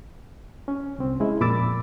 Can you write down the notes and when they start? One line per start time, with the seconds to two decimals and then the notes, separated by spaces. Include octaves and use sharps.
0.68 C#4
0.98 C2 C4
1.20 G#3 C#4 E4
1.40 F2 A#2 B5 D6 E6 A6